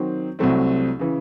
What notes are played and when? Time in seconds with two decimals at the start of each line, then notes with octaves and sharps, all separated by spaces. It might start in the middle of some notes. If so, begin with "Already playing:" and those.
Already playing: D#3 F#3 C4
0.39 C2 C3 F#3 A3 C4
0.99 C#3 E3